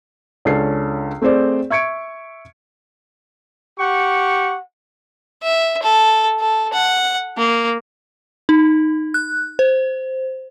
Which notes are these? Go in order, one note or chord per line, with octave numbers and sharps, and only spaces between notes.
C#2 C#4 D4 A4 C7
A3 C4 G#4 C5 D5
E5 C#6 G#6 C#7 D7
G4 F#5 C#6
E5
A4
A4
F#5
A#3
D#4
F#6
C5